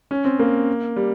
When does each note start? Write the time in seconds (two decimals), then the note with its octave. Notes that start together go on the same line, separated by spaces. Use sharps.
0.11 C#4
0.25 C4
0.39 A#3
0.96 G3